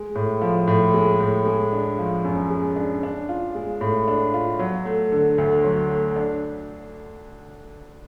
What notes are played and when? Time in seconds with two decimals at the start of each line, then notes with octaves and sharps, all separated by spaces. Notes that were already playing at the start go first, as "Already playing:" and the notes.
Already playing: G#3
0.15 A2
0.41 F3
0.67 A2
0.94 G#3
1.20 A2
1.45 G#3
1.72 D4
1.99 F3
2.24 F#2
2.50 G#3
2.76 D4
3.03 D4
3.29 F4
3.55 G#3
3.81 A2
4.08 D4
4.34 F4
4.59 F#3
4.85 A3
5.12 D3
5.38 D2
5.64 F#3
5.90 A3
6.16 D4